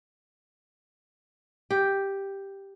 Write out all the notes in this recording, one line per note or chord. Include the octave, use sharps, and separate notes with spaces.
G4